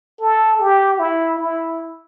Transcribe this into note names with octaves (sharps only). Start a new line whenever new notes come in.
A4
G4
E4
E4